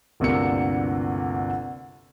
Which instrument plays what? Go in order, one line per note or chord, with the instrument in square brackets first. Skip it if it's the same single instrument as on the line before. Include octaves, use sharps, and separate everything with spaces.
[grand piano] G1 D2 C3 A#3 E6 C#7